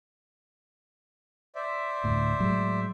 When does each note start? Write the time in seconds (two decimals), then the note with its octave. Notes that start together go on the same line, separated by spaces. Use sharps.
1.55 C5 D5 E5
2.04 D2 A2
2.40 A2 F#3 G#3